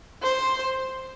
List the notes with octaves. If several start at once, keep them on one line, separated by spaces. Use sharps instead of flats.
C5